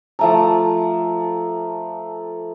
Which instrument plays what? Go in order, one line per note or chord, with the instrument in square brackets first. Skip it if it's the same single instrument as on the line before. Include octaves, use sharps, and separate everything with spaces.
[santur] F3 A3 A#5